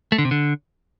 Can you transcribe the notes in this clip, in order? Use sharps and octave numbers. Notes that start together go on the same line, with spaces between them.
A3
D3
C3
D3